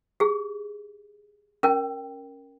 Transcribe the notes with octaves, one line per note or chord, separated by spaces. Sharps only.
G4 G#4
C#4 A#4 G5